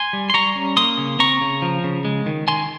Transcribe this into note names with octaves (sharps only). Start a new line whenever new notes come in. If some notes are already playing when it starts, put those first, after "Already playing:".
Already playing: G#5 C6
G3
C6
G3 A#5 C#6
C#4
A#3 C6 D#6
C#3
C4 A#5 C#6
C#3
F3
C#3
G#3
D#3
D#3 G#5 C6